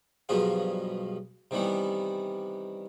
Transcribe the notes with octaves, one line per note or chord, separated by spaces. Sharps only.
G2 B2 F3 F#3 F4 G#4
C3 D#3 E3 G3 B3